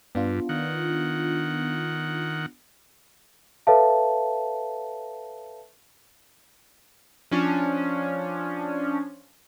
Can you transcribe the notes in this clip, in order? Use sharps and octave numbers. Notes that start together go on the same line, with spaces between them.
G2 B3 D4 F4
D#3 F#5
A4 B4 C#5 E5 F5 A5
F3 C#4 D4